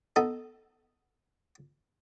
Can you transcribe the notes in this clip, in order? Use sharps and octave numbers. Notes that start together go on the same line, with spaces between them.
B3 D#4 A4